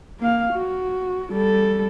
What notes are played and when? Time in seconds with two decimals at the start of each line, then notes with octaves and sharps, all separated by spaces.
0.20 A#3 F5
0.53 F#4
1.32 G3 A4